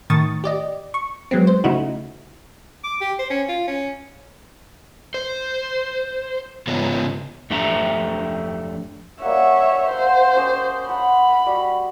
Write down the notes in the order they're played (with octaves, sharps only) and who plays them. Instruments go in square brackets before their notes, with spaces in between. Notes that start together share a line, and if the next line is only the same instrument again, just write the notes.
[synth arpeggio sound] A2 D#3 C#6 D#6 A6
G4 D5 D#5
C#6
F#3 G#3 B3 C4
C5
C#3 A3 D#4 E4 F#4
[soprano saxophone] D6
G4
C5
C#4
F4
C#4
[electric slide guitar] C5
G#2 C#3 B3 F4 C#5 A#5
F2 A3 D4 G4 E5 A#5
[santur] G3 A#3 F#5 [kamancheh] C#5 E5
[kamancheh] C5 [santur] F#5
[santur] C#4 G4 D#5
[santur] F#5 A5 C6 [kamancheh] B5
[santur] G3 F#4